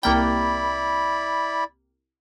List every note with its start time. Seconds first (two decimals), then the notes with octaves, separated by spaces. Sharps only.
0.03 C2 A#3 E4 D5 G5 B5